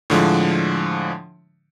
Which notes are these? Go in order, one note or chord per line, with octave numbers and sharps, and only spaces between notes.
A2 D3 F3 G#3